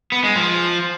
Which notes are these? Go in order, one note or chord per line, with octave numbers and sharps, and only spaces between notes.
B3
G#3
F3